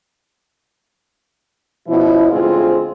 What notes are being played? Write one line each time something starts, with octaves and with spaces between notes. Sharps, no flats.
B2 F3 C#4 E4
D2 G#2 C4 F4 G#4